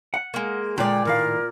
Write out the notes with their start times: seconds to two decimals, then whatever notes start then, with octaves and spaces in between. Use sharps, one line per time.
0.14 F#5
0.34 G#3 A#3
0.78 A#2 D3 G#3 D5 G5
1.05 A2 D#3 A#4 F5